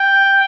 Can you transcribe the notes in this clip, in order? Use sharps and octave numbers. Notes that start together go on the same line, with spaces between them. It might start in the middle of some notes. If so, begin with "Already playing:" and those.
Already playing: G5